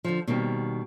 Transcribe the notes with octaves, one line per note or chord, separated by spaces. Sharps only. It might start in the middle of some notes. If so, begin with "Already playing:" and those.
D3 F3
B2 D#3 G3 A#3 C4